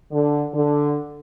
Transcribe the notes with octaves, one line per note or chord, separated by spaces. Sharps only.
D3
D3